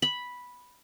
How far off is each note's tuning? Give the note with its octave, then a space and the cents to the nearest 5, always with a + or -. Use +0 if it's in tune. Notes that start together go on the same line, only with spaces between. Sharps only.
B5 -5